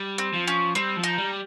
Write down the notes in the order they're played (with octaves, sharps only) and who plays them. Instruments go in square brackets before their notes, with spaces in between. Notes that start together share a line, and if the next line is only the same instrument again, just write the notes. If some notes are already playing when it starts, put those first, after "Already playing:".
Already playing: [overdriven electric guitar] G3
[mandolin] C4
[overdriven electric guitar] F3
[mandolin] C#4
[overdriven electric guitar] G3 [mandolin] C4
[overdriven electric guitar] F3
[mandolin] D#4
[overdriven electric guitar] G3